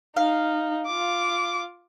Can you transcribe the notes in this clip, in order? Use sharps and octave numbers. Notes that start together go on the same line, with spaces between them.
D#4 F5
F4 D6